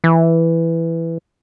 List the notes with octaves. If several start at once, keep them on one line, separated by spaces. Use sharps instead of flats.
E3